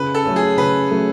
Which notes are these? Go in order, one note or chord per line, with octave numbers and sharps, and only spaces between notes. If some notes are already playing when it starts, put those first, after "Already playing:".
Already playing: C#3 B4
A4
F#3 A3 C#4
G#4
C#3 B4
F#3 A3 C#4